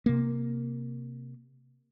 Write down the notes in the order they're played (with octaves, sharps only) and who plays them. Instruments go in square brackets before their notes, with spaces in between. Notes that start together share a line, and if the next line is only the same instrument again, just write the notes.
[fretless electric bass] C3 A#3